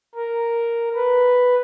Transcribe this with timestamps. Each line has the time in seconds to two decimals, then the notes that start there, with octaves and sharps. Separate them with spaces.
0.15 A#4
0.95 B4